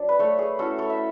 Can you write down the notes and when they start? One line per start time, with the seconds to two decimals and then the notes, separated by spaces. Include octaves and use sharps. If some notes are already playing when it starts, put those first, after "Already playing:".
Already playing: F#3 D4
0.09 B4
0.19 A3 A4 C#5
0.39 G#4
0.59 C#4 E4 F#4 A4
0.78 A4 C#5
0.90 E5